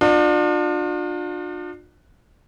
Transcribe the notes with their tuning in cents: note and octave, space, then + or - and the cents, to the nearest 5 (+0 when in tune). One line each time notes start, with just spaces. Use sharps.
D4 +35 F4 +40